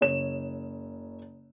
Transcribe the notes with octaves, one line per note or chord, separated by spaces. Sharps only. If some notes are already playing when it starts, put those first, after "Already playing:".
F#1 C#5 E7